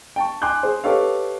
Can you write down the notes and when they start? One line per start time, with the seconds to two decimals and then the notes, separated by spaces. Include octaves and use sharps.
0.16 G5 A5 C#6
0.42 G#5 C6 D6 F#6 G6
0.63 G#4 C5
0.84 G4 A4 B4 C#5 D#5 F5